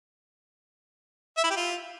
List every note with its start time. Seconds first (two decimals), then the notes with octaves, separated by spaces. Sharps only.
1.37 E5
1.44 E4
1.50 G4
1.57 F4